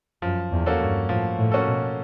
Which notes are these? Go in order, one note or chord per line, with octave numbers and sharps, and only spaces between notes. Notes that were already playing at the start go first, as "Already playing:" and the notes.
F#2 F3
E2
A#3 C#4 F#4 A4
G2
A2 F3
A2
A#3 C#4 F#4 A4
B2